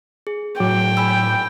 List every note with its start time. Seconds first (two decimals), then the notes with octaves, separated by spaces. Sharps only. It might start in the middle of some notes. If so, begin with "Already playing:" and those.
0.27 G#4
0.60 A2 F#3 G5 D6
0.97 G#5 B5 E6